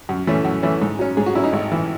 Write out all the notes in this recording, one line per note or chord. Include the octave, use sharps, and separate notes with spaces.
F#2
E3 A3 C#4
F#2
E3 A3 C#4
G#2
F#3 C#4
G#2 G#4
F#4
F#3 C#4 E4
D#4
G#1
E3